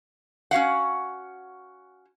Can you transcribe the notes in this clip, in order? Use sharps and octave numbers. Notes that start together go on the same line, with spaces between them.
C#4 F#4 F5 F#5